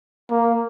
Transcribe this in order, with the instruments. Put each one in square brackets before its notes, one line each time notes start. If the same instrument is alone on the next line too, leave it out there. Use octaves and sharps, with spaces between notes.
[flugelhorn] A#3